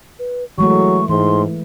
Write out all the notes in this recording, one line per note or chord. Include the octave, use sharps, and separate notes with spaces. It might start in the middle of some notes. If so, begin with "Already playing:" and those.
B4
E3 F#3 G#3 A3 C#6
G#2 E3 C6